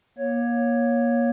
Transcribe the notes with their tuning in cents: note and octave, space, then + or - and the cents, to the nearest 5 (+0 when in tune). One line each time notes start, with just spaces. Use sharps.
A#3 +30 C#5 +0